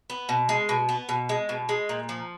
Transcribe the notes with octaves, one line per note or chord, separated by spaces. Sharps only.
B3
B2
G#3
B2
B3
B2
G#3
B2
G#3
A#2
F3